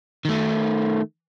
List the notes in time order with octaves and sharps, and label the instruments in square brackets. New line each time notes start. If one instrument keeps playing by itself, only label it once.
[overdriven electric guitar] D#3 A3